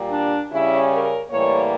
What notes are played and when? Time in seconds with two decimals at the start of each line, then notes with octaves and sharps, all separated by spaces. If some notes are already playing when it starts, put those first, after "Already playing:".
Already playing: A#2 G3 A#3
0.11 D4
0.51 C#3 G3 C#4 E4
0.91 A#4
1.31 A2 E3 G3 A#3 C#5